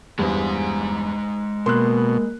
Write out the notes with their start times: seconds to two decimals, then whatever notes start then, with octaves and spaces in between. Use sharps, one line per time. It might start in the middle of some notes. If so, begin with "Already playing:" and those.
0.19 E2 G2 G#3 C5
1.66 B2 A#3 A#4 C6 F#6